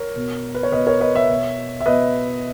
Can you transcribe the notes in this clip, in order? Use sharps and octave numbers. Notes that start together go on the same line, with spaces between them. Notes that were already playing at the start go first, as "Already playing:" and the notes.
Already playing: A#4 C#5
B2
B4
C#5
B2 B4 D#5
A#4 C#5
B4 D#5
C#5 E5
B2
E5
B2 B4 D#5